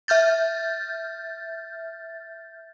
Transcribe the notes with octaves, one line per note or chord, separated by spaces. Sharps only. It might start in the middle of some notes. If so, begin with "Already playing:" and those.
E5 F6 G6 A6